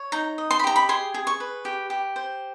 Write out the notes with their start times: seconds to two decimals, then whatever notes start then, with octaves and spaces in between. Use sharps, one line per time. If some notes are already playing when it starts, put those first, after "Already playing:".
Already playing: C#5
0.12 D#4 A#5
0.38 D#5
0.51 C6
0.59 B5
0.64 G4 A#5
0.76 B5
0.89 G#4 C6
1.14 G#4
1.27 C#6
1.40 B4
1.65 G4
1.90 G4
2.16 C5